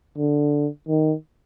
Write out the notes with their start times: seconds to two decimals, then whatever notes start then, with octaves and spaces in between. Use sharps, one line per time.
0.18 D3
0.89 D#3